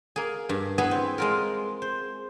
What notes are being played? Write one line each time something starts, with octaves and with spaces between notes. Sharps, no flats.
A#3 G#4
G2
B3 E4 G#4 B4 E5
C4
G#3 F4 A#4
C5